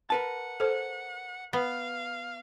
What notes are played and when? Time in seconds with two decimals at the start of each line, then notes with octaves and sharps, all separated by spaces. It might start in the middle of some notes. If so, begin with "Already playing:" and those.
0.10 A#4 B4 F#5 A5
0.60 A4 C5
1.53 B3 F5